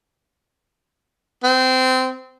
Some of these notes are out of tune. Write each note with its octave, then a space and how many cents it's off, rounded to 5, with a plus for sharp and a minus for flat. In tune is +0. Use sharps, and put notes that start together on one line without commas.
C4 -20